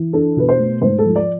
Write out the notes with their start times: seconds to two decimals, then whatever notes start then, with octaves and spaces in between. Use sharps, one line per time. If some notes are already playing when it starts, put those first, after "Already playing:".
Already playing: E3
0.13 D4 A4
0.37 B2 B4
0.49 C5
0.59 A3
0.82 G#2 C5
0.99 A4
1.05 F3
1.16 D5